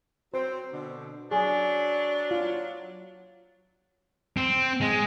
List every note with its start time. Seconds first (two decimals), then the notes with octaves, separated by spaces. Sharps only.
0.34 F#3 C4 C5
0.72 B2 D3
1.31 F#3 D4 G#4
2.31 F4
4.37 C4
4.81 G#3